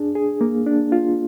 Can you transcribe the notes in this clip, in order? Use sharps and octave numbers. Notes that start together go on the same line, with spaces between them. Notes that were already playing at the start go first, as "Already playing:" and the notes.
Already playing: D4 G#4
G#4
A#3
D4
F4